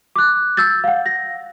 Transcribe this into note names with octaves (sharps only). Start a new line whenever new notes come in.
D6 F#6
E6 G6 A6
F5 F#5
A#6